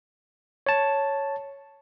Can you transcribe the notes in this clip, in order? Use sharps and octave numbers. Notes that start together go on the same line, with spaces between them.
C#5 A5